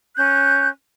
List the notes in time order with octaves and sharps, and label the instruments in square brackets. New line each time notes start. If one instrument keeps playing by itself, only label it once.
[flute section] C#4 F#6 G6